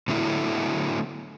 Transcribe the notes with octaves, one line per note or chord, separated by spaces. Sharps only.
A2 D3 F#3 A3 B3 E4